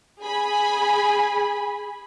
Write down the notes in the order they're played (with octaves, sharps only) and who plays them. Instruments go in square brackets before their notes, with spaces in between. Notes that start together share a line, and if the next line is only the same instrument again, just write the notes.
[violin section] G#4 G#5 B5